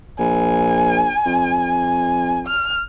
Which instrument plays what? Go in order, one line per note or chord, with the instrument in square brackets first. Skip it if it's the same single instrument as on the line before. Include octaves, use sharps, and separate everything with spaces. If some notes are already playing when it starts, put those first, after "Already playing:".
[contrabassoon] A#1 [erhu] G#5
[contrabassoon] F2
[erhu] F6